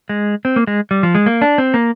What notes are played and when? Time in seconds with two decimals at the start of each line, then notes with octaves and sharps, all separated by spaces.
0.09 G#3
0.45 C4
0.56 A#3
0.67 G#3
0.91 G3
1.03 F3
1.15 G#3
1.26 A#3
1.42 D4
1.58 C4
1.74 A#3